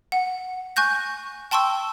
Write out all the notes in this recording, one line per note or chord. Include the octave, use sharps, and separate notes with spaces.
F#5
G#5 C#6 F#6 G6 A#6
G5 A5 C6 C#6 E6